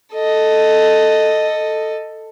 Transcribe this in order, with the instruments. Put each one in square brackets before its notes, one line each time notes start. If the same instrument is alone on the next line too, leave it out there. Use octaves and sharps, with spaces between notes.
[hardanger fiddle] A4 D#5